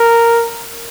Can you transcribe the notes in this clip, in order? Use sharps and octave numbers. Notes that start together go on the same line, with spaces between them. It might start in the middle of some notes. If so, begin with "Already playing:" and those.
Already playing: A#4